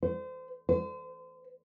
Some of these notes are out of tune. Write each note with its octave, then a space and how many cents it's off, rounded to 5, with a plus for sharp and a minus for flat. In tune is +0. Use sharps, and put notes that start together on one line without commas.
C5 -30
C5 -35